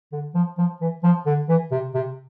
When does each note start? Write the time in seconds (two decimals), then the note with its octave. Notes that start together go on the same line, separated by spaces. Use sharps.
0.13 D3
0.35 F3
0.58 F3
0.81 E3
1.04 F3
1.26 D3
1.49 E3
1.71 C3
1.94 C3